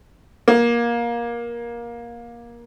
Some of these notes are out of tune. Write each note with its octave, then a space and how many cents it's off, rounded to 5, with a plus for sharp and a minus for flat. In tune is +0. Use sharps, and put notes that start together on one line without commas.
A#3 +20